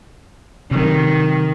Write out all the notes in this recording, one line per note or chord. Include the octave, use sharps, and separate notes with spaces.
C3 D#3 F#3